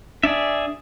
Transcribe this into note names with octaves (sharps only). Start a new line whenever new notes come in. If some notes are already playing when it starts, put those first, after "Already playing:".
D4 G#4 D5 E5